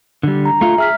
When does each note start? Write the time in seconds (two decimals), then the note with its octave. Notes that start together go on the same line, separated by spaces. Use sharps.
0.23 D3 G3
0.45 A#5
0.61 A3 F4
0.78 G#4 E5 F6 B6